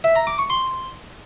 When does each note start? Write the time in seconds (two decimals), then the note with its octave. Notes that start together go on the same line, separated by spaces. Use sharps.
0.04 E5
0.16 A#5
0.27 D6
0.38 C#6
0.50 C6